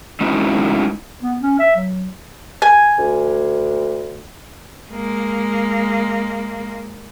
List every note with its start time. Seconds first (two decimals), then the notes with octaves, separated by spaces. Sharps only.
0.21 G#3 C#4 D#4 E4 F#4
1.22 B3
1.41 C#4
1.59 E5
1.76 F#3
2.62 G#5
2.99 D2
4.90 G#3 A#3